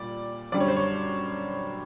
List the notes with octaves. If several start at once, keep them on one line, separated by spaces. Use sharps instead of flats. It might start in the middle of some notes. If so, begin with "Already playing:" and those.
Already playing: A#2 G3 D5
F#2 D3 G3 D5
C#5
C5
C#5